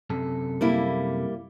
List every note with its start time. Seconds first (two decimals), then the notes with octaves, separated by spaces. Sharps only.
0.10 F#2 C3 A4
0.61 G3 A#3 E4